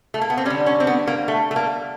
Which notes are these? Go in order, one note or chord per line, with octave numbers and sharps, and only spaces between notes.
A3
A#3
B3
C4
D3 G3 C#4
C#4
C4
B3
A#3
A3
A3
A#3